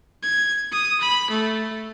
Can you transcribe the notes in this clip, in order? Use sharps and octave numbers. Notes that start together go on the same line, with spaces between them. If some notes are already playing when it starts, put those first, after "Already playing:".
G#6
D#6
B5
A3